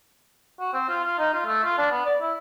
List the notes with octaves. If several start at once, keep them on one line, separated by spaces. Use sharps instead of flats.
F#4
C4
F4
F4
D#4
F4
A3
F4
D4
B3
D5
E4